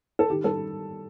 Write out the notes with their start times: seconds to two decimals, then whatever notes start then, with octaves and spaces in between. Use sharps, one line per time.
0.19 A4
0.30 D#3 G4
0.44 G3 A4